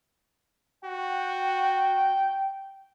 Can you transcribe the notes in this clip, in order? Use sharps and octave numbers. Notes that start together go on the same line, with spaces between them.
F#4 G5